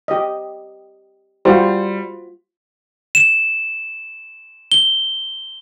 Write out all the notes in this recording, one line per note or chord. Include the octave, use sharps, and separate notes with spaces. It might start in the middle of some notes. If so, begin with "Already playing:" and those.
G4 D#5
G3 F4 F#4 C5
E7
G7